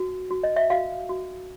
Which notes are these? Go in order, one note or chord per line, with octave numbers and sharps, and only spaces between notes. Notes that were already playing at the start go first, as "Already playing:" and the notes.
Already playing: F#4
F#4
D#5
E5
F#4 F5
F#4